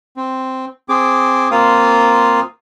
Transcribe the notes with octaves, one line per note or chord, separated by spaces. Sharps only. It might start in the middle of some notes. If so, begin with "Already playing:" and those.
C4
C4 G#4 D6
A#3 C4 F4 F5 D#6